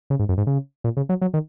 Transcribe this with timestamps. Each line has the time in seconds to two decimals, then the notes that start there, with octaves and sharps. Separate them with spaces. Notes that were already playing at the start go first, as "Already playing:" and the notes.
0.10 C#3
0.19 G#2
0.29 F#2
0.38 G#2
0.47 C#3
0.84 A#2
0.97 C#3
1.09 F#3
1.22 F#3
1.34 D#3